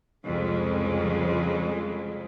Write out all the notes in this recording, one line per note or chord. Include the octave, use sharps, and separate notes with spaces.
C2 F2 C#3 G#3